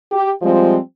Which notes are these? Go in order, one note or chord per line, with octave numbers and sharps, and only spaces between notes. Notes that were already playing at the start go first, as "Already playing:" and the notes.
G4
F3 G3 G#3 C4 F4